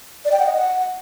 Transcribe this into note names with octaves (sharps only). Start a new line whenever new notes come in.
D5
G5
F#5
D#5
F#5